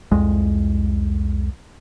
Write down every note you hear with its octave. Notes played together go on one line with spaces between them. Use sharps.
C2 F2 G#3